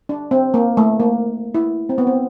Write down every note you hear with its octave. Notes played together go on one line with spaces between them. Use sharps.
D4
C4
A#3
A3
A#3
E4
C4
B3
C4